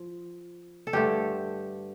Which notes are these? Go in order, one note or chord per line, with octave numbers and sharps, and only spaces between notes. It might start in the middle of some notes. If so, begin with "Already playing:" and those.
Already playing: F3
A4
G2 D3 A3 G4